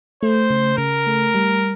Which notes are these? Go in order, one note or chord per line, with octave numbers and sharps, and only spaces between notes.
A3 C5
C#3
C#3 A#4
A3
G3